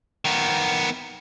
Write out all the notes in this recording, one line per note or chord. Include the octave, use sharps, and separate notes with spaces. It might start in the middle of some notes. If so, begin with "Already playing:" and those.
D#3 B3